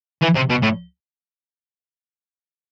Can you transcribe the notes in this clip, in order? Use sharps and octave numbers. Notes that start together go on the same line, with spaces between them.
E3
C3
B2
A2